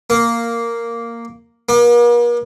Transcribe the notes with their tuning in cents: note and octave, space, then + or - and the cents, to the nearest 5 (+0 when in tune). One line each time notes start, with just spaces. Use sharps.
A#3 -5
A#3 +45